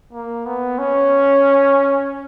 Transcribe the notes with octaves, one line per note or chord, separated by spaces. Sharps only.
A#3
B3
C#4